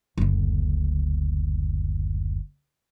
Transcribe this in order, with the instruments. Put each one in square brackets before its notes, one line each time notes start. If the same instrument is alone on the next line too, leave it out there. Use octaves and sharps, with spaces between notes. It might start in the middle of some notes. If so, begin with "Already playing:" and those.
[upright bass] F#1 D2